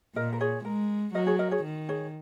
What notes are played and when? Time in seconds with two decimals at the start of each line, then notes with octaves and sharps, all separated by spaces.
0.15 A#2 A#4 D#5
0.33 A#4
0.41 G#4 C#5
0.65 G#3 A#4
1.14 F#3 A#4 D#5
1.27 G#4 C#5
1.39 A#4 D#5
1.51 G#4 C#5
1.63 D#3
1.89 G#4 C#5